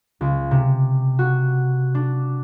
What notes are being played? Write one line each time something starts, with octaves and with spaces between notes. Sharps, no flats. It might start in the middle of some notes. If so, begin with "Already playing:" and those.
C#2
C3
F#4
D4